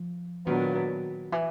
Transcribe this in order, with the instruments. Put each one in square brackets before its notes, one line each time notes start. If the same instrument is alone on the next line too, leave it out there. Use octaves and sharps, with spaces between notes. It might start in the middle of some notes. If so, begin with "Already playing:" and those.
Already playing: [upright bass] F3
[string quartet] A#2 F#3 B3 D4 [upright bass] D#3
[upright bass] E3